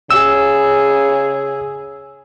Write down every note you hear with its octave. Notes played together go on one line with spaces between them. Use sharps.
C#3 G#4 E6